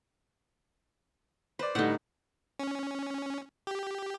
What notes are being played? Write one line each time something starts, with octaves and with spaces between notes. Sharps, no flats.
B4 C5 D5
A2 D3 G3 D#4 F#5
C#4
G4